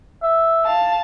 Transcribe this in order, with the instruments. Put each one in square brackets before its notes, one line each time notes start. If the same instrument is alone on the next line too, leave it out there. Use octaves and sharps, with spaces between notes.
[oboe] E5
[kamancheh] F5 A5